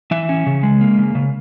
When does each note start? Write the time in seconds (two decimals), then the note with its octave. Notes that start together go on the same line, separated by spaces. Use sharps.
0.11 E3 E5
0.29 C#4
0.46 C#3
0.63 G#3
0.81 A#3
0.98 C#3
1.15 C#3